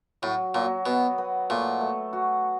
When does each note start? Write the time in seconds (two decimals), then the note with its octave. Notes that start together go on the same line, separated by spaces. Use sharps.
0.22 A2 F#3
0.54 A#2 F#3
0.86 B2 B3
1.18 B3
1.50 A#2 A3
1.81 A3
2.13 F#4